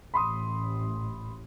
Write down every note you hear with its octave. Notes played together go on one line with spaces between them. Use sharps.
A1 B5 C6 D#6